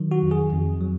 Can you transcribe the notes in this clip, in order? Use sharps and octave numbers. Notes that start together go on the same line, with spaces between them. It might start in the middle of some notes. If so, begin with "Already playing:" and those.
Already playing: D#3 F#3
F#4
F2
G#4
F2
F#3